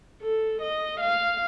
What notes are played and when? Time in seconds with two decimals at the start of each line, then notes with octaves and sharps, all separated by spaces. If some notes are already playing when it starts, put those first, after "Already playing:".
0.21 A4
0.62 D#5
1.01 F5